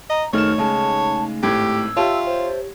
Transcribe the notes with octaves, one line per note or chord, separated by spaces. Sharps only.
D#5 A#5
F#1 D#3 A3 D#4 C#5 F6 E7
C#3 G#3 A5
G#1 A2 G4 E6 G#6
F4 G4 C#5 E5 G5 A5
C5